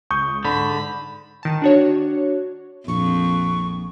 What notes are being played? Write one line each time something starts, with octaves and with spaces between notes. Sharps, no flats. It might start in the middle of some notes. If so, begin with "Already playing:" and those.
C#2 C#6 D#6 G6
G#2 D3 B5
D#3 A5
D4 F#4 C#5
A#1 F2 C#6